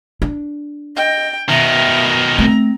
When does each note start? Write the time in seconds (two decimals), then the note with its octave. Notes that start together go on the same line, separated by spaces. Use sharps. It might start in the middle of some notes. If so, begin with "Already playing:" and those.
0.22 D4
0.96 D#5 G5
1.49 B2 D#3 E5 A#5
2.38 A3 C4